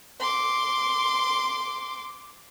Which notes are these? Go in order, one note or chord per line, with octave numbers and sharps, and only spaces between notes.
C6 D6